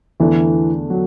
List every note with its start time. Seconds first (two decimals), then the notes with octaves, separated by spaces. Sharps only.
0.20 E2 D3 E3 A3 D4 A4
0.90 F#3